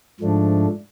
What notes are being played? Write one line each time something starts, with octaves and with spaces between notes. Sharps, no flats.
G#2 F3 A3 D4